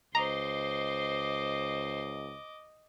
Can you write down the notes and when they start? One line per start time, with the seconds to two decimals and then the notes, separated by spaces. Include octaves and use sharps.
0.15 C#2 C5 D#5 A#5 C6 D6